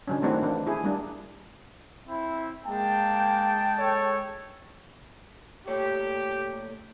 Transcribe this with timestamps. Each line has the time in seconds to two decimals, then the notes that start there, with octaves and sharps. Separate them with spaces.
0.08 D3 F#3 C#4
0.22 D#3 A3 C4 D4 E4 F#4
0.43 E3 A#3 D4
0.67 E4 G#4
0.84 G3 A#3 D4
2.08 C4 E4
2.67 G#3 A#3 G5 A5
3.78 A4 C#5
5.67 A#2 A3 G4 C#5